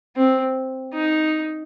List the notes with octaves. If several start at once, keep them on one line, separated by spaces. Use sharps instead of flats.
C4
D#4